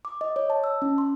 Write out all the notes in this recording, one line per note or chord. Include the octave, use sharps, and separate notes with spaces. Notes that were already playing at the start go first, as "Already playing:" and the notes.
D6
D#5
C#5
A5
E6
C#4
C6